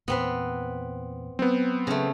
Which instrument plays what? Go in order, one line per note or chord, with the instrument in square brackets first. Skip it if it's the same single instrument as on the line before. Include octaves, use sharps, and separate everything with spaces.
[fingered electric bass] E2 A#2 [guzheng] B3 C4 B4
[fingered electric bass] F#3 [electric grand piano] B3 C4
[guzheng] C#3 A3